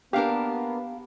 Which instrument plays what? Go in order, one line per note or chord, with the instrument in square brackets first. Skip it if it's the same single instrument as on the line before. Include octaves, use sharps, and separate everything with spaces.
[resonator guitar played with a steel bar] A#3 D4 A#4 [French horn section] B3 [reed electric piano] G4 F5